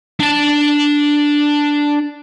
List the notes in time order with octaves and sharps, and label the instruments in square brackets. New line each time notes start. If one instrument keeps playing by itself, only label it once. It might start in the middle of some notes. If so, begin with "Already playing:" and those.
[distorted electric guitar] D4 A5